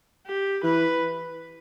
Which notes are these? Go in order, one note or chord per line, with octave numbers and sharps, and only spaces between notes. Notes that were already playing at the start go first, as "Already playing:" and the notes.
G4
E3 B4